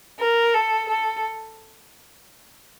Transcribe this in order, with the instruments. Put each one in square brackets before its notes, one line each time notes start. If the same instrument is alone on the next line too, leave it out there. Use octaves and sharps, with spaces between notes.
[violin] A#4
A4
A4